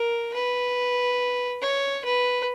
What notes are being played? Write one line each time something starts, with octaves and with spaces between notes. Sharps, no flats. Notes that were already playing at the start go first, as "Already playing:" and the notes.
Already playing: A#4
B4
C#5
B4